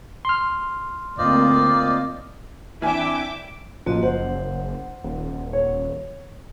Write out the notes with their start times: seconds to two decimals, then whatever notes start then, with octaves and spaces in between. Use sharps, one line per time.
0.25 C6 F6
1.18 D2 A#3 C4 F4 C5 D5 D#5
2.82 E3 C4 D4 E4 E5 G5 G#5 D6
3.86 A1 F3 A#3 F#4 D#5
4.03 F#1 C5 F#5
5.04 D#1
5.53 C#5